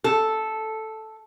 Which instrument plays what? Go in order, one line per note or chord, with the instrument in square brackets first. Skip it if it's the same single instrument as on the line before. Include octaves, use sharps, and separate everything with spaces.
[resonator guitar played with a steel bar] A4